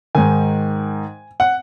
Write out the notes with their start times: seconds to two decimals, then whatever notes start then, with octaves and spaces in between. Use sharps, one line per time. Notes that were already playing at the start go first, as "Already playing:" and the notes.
0.15 G#2 D#3 G#5
1.40 F#5